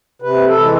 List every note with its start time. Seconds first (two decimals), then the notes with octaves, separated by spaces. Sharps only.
0.22 C3 B4
0.47 A4
0.59 E3 G#3